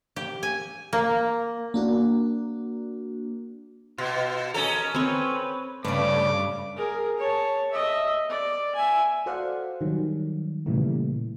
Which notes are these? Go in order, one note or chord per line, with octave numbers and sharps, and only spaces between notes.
G4
G#5
A#3
A#3 D4 F#4
B2 F4
C#4 A4 A#4 D#5
C4 B4 C#5
G2 C#3 A3 B4 D5 D6
G#4 A#4
C#5 A5
D#5 E5
D5
E5 G#5
F#4 A4 C5 D5 F5 F#5
D#3 F#3 G3
A#2 C#3 E3 G3 A3